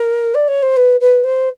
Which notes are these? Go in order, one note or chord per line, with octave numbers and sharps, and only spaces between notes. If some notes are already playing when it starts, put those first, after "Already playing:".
Already playing: A#4
D5
C#5
C5
B4
B4
C5